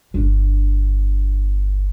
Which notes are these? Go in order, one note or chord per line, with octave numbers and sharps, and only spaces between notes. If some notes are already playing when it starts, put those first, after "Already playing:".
G1 D4